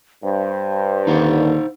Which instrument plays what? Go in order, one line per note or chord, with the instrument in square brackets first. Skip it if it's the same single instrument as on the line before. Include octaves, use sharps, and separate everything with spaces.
[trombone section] G2 [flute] C5
[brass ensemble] D#2 D3 [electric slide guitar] D#4 F5 F#5